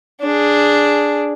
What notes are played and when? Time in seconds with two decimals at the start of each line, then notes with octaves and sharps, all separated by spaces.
0.22 D4 G#4